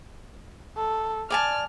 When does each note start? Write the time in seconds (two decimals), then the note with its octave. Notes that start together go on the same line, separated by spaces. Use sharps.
0.77 A4
1.30 D5 G#5 A5 F6